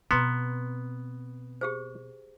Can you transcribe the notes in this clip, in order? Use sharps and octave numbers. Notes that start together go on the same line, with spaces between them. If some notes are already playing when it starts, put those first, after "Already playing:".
B2 B3 C4 B4 A#5 C6
G4 G#4 C5